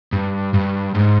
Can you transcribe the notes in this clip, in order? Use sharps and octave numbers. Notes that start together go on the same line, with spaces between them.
G2
G2
G#2